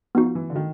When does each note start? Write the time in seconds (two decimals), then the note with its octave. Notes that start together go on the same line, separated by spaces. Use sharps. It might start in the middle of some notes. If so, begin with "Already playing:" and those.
0.15 F3 B3 D#4 F#4
0.35 E3
0.50 D3
0.56 D#3